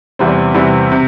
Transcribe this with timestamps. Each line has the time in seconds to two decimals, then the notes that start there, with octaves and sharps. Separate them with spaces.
0.19 E2 C3 E3 G3 C4
0.54 E2 C3 E3 G3 C4
0.92 C3